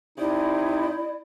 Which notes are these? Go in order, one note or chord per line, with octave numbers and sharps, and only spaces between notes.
C3 D#4 E4 D5